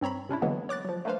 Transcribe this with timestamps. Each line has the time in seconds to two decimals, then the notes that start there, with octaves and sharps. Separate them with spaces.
0.01 G2 C4 C#5 A#5 B5
0.29 C3 C#4 D4 E4
0.42 D3 E3 F#3 G#3 A#3 B3
0.69 C#5 D6 F#6 A6
0.85 F3 F#3
1.05 A3 A#3 D4 B4 C5 F5